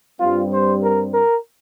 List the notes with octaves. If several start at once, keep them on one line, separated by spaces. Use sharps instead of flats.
G2 G3 C4 F4
C5
A#4
A#4